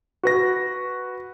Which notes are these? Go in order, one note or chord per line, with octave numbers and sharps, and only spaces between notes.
F#4 B4 A#6